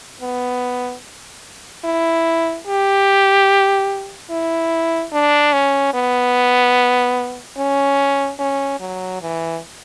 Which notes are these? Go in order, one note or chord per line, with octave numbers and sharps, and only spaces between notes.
B3
E4
G4
E4
D4
C#4
B3
C#4
C#4
F#3
E3